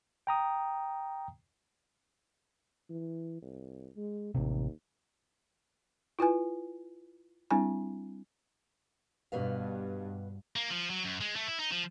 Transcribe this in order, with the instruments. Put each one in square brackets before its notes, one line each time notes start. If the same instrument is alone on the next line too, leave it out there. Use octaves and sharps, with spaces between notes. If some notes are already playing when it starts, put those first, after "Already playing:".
[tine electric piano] G5 A#5 D#6
[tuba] E3
C2
G#3
[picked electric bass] A1 C3 [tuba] D#2
[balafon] E4 F4 B4 G#5
G3 C4 D4 E4 G#5
[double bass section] G2 [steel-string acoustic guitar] B2 B4 F5
[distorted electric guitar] A#3
F3
F#3
F#2
G#3
A3
E4
D#4
F3